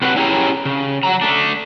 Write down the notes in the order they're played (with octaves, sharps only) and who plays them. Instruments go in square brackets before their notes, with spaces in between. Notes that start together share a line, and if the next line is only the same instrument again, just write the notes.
[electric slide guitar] C3 F#4 B4 C#5 D5 F#5
C#4 E4 G4 G#4 C#5 A#5
C#3
F#3 A#5
A3 D4